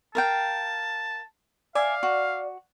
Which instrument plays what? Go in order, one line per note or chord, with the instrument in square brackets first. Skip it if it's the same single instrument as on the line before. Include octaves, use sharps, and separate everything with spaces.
[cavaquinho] A#4 F5 G5 [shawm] A5
[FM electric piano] D5 [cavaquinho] E5 G#5 D6 [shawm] F5
[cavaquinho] F#4